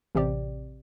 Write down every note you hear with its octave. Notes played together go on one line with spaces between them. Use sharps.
A1 C3 C4 G4 D5